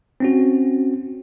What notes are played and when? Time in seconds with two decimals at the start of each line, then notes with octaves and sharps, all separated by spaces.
0.20 C4 C#4 F#4